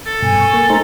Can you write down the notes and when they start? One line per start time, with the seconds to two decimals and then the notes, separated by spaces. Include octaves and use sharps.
0.06 A4
0.22 G2 B2 G#5
0.36 C#6
0.53 A#3
0.70 A3 D#4 C5 A#5